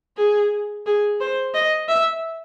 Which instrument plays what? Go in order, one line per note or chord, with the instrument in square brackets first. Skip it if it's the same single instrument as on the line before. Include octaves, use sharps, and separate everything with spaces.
[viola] G#4
G#4
C5
D#5
E5